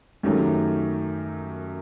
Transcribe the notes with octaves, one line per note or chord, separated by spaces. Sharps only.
F#2 D#3 F#3 A3 G4